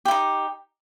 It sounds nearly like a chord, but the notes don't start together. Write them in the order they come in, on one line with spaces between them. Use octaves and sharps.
G4 E4 D#4